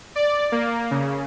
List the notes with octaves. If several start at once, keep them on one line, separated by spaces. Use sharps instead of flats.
D5
A#3
C#3